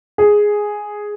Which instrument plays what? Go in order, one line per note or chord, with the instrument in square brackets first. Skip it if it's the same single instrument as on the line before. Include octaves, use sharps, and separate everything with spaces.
[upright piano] G#4